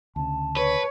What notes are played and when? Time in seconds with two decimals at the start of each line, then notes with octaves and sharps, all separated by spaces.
0.16 D2 C#3 A5
0.56 B4 C#5